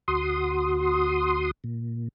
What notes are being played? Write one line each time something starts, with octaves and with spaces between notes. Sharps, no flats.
D2 F#4 C6 D#6
A#2